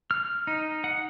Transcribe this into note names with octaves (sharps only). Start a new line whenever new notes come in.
F6
D#4
F#5